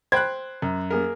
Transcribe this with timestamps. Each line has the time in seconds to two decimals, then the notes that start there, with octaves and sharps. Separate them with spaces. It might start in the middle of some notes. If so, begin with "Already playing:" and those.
0.12 C5 G5 B5 F#6 G#6
0.62 F#2
0.91 A#3 G#4 A#4